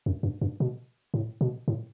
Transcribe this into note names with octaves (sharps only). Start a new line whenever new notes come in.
F#2
G2
G2
B2
A2
B2
A2